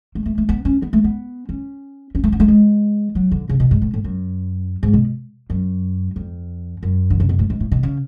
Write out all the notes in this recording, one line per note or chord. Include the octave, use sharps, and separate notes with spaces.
A3
A3
A3
B3
C#4
B3
A3
B3
C#4
C#4
A3
B3
A3
G#3
F#3
D3
C#3
B2
G#2
A2
A2
F#2
G#2
B2
F#2
F2
F#2
D3
C#3
B2
A2
G#2
A2
B2
C#3